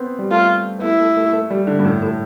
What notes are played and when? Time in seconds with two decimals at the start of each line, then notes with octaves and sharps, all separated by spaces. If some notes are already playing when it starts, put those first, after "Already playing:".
Already playing: B3 C4
0.19 G3
0.31 A3 F4
0.79 B3
0.82 A3 E4
1.00 A3
1.17 A3
1.33 A3
1.50 G3
1.67 D3
1.79 G2
1.84 A2
2.02 A2